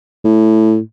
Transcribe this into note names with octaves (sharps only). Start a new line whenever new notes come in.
A2